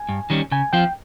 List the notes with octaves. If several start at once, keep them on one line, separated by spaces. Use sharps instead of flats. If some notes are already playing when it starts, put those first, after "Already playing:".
Already playing: G#5
G2
D#3 G3 C#4
C#3 G#5
F3 C4 F4 G5